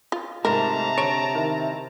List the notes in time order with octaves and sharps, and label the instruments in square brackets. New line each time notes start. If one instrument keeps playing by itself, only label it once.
[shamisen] F4
[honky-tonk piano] G#2 A3 [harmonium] C3 [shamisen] A#4 [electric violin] A5 A#5
[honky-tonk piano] D3 D7 [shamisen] C#5
[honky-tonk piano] D#3 E4